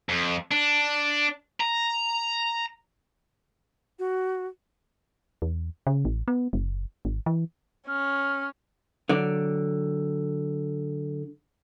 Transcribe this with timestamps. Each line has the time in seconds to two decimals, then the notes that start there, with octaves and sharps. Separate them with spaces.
0.09 F2
0.51 D4
1.60 A#5
3.99 F#4
5.42 E2
5.87 C#3
6.05 A1
6.28 B3
6.53 F#1
7.05 G#1
7.26 E3
7.88 C#4 F6
9.09 D3 F#3 D5